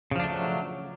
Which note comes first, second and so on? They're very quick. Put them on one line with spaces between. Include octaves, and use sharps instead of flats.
C#3 F3 D4 A3 F#3